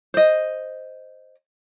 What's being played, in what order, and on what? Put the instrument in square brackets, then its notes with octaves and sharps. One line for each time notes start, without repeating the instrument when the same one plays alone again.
[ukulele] C5 D#5